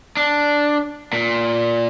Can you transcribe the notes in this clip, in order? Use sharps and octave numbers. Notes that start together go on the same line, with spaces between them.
D4
A#2